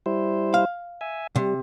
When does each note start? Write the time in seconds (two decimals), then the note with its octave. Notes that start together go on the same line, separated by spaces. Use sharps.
0.06 G3 E4 C5
0.54 F5
1.01 E5 G#5
1.36 C3 G3